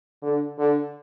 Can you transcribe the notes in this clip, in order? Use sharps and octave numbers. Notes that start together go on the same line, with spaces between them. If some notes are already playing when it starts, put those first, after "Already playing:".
D3
D3